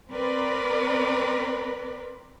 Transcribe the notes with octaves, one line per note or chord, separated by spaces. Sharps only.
C4 A#4 B4 D5